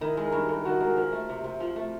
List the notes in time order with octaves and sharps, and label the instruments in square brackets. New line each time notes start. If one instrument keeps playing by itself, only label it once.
[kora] D#3 [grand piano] E4
[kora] G#3
[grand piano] A#4
[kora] G2
[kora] G2 [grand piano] A4
[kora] D#3 [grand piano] F#4
[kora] G#3 [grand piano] A#4
[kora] F3 [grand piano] A#4
[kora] A3
C3
C3
F3
A3